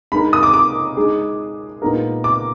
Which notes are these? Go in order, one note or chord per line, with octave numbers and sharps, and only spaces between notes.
G#3 D#4 A#4 B5
D#6
D6
D6
G#3 D#4 G#4
A#2 G#3 B3 D#4 A#4
D6